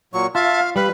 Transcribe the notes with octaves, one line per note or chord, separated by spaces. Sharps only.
A#2 F#3 C#6
F4 E5 F5 A5
G3 B4 F5 B5